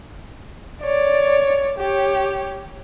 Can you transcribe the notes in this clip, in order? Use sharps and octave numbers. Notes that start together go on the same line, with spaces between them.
C#5 D5
G4 C#5